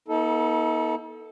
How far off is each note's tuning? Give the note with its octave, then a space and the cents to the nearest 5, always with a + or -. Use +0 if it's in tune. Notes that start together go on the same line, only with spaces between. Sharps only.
B3 -40 D#4 +45 A4 +0